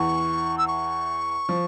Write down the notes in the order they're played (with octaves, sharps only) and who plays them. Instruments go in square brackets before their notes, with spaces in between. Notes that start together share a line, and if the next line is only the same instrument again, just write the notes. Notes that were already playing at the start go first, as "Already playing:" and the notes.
Already playing: [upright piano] E2 E3 [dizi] C#6
[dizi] E6
C#6
[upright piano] F3